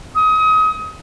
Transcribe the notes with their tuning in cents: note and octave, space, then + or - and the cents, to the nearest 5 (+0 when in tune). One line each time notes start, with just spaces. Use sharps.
D#6 +30